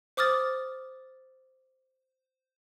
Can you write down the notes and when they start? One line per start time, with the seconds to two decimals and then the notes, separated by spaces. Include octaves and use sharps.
0.17 C5 D6 D#6 F6 A6